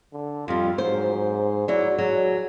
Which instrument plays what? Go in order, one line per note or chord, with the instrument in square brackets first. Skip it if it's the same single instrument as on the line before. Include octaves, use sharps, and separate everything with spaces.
[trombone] D3
[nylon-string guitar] F2 G3 [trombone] F4
[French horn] G#2 [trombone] F#3 [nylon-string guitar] C5
[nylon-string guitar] F#3 E4 [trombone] F#4 [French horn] D5
[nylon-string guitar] F#3 [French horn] G#4